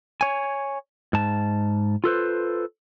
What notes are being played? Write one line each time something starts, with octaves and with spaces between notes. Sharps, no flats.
C#5 G#5
G#2 A5
F4 A4 B4 C5